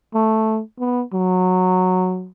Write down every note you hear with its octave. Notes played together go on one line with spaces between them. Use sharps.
A3
B3
F#3